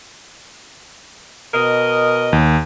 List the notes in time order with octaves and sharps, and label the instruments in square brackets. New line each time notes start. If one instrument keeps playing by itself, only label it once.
[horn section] B2 A#4 D#5
[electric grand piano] D#2